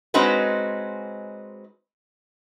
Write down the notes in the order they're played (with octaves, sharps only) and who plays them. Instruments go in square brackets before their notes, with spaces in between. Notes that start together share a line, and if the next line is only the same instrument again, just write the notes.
[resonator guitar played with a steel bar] G#3 C4 C#4 D#4 F#4 B4